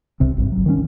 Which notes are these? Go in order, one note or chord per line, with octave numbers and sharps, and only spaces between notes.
C2 C3 C4
G#1 G2
G1 F#3
D#3 G3 C4 C#4